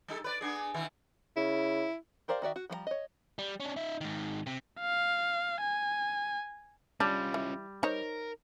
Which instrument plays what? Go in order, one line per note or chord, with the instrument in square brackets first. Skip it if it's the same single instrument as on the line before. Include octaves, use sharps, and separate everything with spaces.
[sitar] G3 D#4 A4
B4 D5
B3 D4 G#4
B2 D#3 E3
[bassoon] C#3 [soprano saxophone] E4
[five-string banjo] G4 A#4 C5 D5 F5
D#3 F#4 D5 E5
F#4
F3 G3 A4 A#5
C#5 D#5
[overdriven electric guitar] G3
C#4 D4
D#4 E5
G#2 D#3
C3
[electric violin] F5
G#5
[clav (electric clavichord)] G3 [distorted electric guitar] C#4 F4 [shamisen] D4
[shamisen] E3
[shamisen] D#4 C5 C#5 [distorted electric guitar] A#4